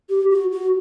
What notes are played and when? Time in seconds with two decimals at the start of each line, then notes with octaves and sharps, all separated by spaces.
0.10 G4
0.30 F#4
0.52 F#4